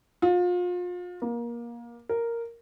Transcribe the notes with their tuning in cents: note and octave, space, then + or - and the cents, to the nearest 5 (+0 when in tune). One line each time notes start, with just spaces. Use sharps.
F4 +35
A#3 +25
A#4 -5